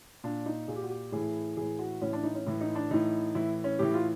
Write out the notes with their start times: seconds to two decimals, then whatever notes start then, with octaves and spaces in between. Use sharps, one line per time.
0.24 A#2 D4
0.46 D#4
0.68 A#2 G#4
0.76 G4
0.83 F#4
0.90 G4
1.12 A2 E3 G#4
1.56 A2 E3 G#4
1.79 F#4
2.01 A2 E3 C#4
2.13 D4
2.24 D#4
2.35 C#4
2.46 A2 E3
2.61 D#4
2.75 D4
2.91 A2 E3 D#4
3.35 A2 E3 E4
3.64 C#4
3.79 A2 E3 G4
3.94 F4